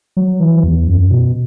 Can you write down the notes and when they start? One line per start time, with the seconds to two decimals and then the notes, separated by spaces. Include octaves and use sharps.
0.17 F#3
0.40 E3
0.64 E2
0.87 F#2
1.10 B2